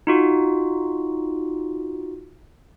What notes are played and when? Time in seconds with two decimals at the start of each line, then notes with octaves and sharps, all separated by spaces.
0.07 D#4 F4 F#4